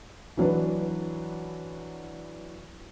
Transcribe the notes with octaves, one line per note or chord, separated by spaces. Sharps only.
E3 F#3 D4 B4